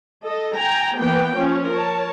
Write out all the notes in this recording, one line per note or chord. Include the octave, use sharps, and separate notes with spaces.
A4 D#5
G5 G#5 A#5
E3 A#3 B3 G5
F3 C#4
A#4 C#5 A5